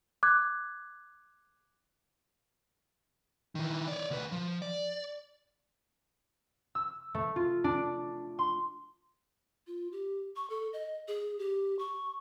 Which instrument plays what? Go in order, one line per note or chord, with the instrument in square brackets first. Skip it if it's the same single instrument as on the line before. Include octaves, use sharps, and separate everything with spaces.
[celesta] D6 F#6 G#6
[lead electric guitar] D#3 E3
C#5 D5
D2 B4
F3
D5
[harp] E6
A3
F4
D4
C6
[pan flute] F4
G4
C#6
A4
D#5
G#4
G4
C#6